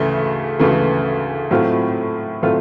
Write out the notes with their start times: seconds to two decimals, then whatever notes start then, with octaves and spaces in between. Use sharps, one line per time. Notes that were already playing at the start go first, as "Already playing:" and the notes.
Already playing: D2 C#3 E3 A3
0.59 D2 C#3 E3 A3
1.51 A2 F#3 A3 C4 F4
2.43 A2 F#3 A3 C4 F4